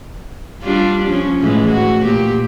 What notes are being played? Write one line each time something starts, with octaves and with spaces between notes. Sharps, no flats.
G3 D4 F4
F3 C#4
A2 E3 G#3
F#4
A#2 G4